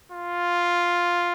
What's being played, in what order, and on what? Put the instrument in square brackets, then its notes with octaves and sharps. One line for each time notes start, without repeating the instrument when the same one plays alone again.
[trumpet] F4